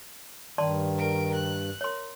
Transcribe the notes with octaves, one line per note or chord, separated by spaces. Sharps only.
G2 D#3 D5 A5 C6
A#4 D7
F#6
A#4 C#5 C6